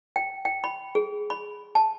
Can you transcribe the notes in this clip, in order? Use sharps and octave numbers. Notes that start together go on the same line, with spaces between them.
G5
G5
B5
G#4
B5
A5